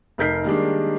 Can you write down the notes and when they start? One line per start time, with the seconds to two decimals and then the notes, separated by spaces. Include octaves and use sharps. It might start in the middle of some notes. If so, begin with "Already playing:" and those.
0.18 F1 D#4 A#4 G6 B6 C7
0.45 D#3 G3 G#3 A#3 D4